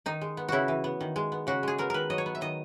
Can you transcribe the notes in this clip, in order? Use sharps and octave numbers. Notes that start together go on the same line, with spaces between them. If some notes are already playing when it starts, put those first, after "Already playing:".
D#3 D#4
G#3
B3
C#3 E4 F#4
E3
B3
D#3
G#3
B3
C#3 F#4
G#3 G#4
B3 A#4
D#3 A#4 B4
F#3 D#5
C#5
B3
E5
D#3 D#5